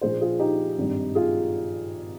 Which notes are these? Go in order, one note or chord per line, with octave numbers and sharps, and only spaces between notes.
A#1 A#2 F3 G#4 C5
F4 G#4
D#4 G4
G#1 G2 G3
F4 G#4